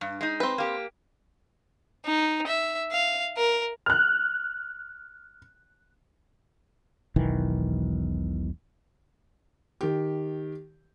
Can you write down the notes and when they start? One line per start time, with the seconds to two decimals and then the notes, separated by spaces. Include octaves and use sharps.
0.01 G2
0.21 G#3 D#4
0.40 C4 B4
0.58 A#3 G4
2.06 D#4
2.47 E5
2.92 F5
3.37 A#4
3.86 F6 F#6
7.16 E1 B1 D#3 E3
9.81 D#3 G4